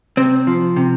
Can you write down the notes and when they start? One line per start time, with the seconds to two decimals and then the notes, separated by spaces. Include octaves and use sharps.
0.17 C3 C4
0.47 F3
0.76 C3